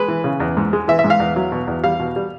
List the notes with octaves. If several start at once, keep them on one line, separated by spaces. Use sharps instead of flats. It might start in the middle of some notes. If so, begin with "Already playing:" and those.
Already playing: G#3 B4
E3
C#3
E2
G#2
G#3
E3 E5
E5
G#2
F5
E2
F#3
B2
E2
G3 F5
B2
G3